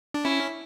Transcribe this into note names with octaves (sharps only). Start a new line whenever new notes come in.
D4
C#4 E4